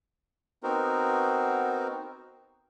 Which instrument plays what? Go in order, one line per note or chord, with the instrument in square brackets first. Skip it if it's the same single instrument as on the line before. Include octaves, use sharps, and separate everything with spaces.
[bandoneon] B3 C4 D#4 F#4 A#4 C5